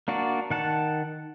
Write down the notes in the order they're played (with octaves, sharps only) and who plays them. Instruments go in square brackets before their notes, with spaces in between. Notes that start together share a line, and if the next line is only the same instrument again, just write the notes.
[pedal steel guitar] A#3 D4 F#4 D5
D#3 F#5 A5